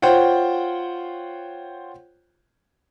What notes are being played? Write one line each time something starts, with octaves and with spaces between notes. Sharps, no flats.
F4 C5 C#5 F#5 G5